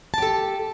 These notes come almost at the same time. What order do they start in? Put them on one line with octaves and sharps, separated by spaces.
A5 G4 A4